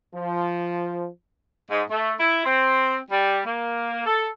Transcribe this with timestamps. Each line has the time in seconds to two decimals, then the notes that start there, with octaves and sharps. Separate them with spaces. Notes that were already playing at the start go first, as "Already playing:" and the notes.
0.14 F3
1.70 G#2
1.90 A3
2.19 E4
2.45 C4
3.11 G3
3.46 A#3
4.06 A4